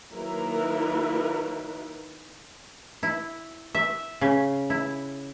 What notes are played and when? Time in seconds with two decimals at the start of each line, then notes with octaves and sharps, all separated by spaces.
0.13 D#3 F#3 A#3 E4 A#4 B4
3.03 E4
3.75 E5
4.21 C#3
4.70 E4